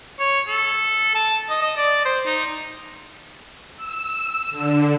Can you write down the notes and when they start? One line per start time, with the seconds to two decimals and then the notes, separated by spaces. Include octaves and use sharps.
0.19 C#5
0.48 A4
1.15 A5
1.49 D#5
1.62 D#5
1.77 D5
2.05 C5
2.26 D#4
3.76 E6
4.50 D3